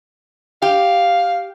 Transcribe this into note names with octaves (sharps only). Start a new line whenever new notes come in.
G4 F5